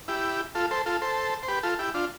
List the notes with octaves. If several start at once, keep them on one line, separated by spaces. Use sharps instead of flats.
E4 G4
F4 A4
A4 C5
F4 A4
A4 C5
C5
G4 B4
F4 A4
E4 G4
D4 F4